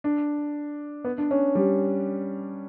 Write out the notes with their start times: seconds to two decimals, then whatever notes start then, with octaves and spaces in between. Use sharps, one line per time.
0.04 D4
1.04 B3
1.18 D4
1.31 C#4
1.55 G3